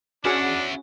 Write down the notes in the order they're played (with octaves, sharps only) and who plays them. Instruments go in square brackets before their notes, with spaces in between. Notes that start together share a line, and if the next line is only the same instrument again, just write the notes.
[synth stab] C#4 F#4 G#4 [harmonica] D4 [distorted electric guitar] E4 F#5